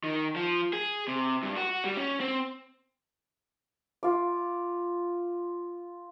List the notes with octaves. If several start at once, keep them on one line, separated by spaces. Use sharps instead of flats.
D#3
F3
G#4
C3
G2
F#4
G3
C#4
C4
F4 D6